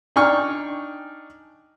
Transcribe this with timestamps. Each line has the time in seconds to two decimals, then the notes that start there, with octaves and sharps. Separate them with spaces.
0.16 D4 D#4 G5 G#5 C#6 F6